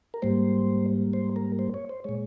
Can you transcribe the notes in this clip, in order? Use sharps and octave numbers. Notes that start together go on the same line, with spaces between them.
A#4
G#2 G3 A#3 C5
C5
A#4
C5
C#5
C5
A#2 G#3 C#5